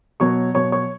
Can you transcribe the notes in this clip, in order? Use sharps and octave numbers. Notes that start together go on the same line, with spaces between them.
B2 F#3 C#5 C#6
B2 F#3 C#5 C#6
C#5 C#6